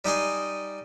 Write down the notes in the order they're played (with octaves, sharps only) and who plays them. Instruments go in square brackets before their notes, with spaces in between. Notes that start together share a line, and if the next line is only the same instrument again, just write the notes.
[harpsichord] G3 D#4 D#5 G#5 C6